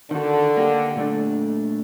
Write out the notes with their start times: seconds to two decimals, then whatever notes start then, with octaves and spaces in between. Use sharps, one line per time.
0.11 D3 D#3 F#4
0.57 A#3 G4
0.96 A#2 A3 D4